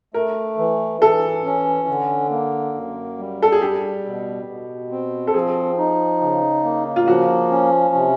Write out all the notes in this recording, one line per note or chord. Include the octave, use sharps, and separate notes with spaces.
A3 A#4
E3
E3 A4
C#4
D3
A#3
F#2
G3
A4
G#4
G3 G4
B2
B2
C4
A4
F3 G#4
D#4
C#3
A#3
F4
F3 F#4
C#4
C3